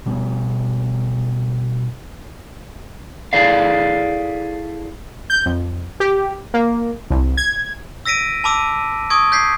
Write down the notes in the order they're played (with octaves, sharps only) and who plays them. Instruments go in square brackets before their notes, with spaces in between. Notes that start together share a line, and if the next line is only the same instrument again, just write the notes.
[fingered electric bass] B2 G3 A3 B3
[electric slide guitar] E4 G#4 A4 D5 F5
[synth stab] G6
F2
G4
A#3
C2
G#6
[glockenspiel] E6 A#6 B6 D7 D#7
A5 B5 D6 E6 D#7
C#6 D#6 G#6 D7
G6 G#6 B6 C7